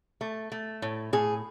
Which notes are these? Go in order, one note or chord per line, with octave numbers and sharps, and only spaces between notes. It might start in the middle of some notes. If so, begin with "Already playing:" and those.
A3
A3
A2
A2 G#4